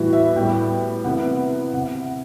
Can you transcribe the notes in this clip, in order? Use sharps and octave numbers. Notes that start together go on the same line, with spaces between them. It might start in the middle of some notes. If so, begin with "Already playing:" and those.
Already playing: A2 E3 G3 B3 E4 F#4
E5
A2 G3 B3 G5
C3 E3 B3 F#5
C3 F#5